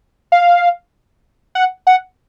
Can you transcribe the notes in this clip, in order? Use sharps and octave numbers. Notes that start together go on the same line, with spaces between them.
F5
F#5
F#5